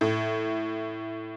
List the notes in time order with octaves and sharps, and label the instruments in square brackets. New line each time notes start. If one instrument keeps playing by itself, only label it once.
[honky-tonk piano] A2